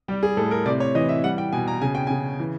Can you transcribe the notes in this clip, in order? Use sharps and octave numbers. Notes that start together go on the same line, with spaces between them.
G3 G4
G#4
A2 A4
A#4
C3 D5
C#5
E3 D#5
E5
G3 F#5
G5
B2 G#5
A#5
C#3 G#5
G5
C#3 G#5
E3